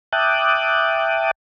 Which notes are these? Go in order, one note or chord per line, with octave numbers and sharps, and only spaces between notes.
E5 G5 A5 D6 D#6 F#6